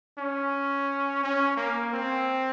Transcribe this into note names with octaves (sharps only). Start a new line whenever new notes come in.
C#4
C#4
A#3
C4